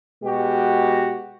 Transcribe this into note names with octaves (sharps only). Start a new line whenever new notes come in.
B2 G#3 F#4 G4